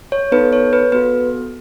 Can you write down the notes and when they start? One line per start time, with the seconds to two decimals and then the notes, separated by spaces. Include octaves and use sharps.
0.12 C#5
0.32 B3 D#4 A4 B4
0.53 C#5
0.73 B4
0.92 B3 F#4 A4 B4